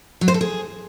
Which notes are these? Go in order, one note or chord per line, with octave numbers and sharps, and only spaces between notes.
F#3
C5
A4
G#4